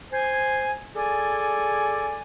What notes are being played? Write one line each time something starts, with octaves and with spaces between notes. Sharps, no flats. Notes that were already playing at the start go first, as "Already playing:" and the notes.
C5 G#5
G#4 A4 D5 G#5